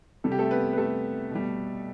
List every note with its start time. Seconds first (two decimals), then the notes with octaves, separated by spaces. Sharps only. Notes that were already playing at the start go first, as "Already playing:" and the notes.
0.24 C3 G3 A4
0.32 G4
0.39 A3 A4
0.51 B3 B4
0.73 B4
0.78 A3 A4
1.31 B2 G3